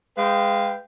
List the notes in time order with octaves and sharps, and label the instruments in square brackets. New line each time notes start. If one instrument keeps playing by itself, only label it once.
[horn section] G#3 B4 F5 G5